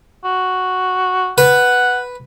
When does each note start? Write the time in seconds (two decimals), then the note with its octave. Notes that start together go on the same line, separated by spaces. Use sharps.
0.24 F#4
1.38 B4 F#5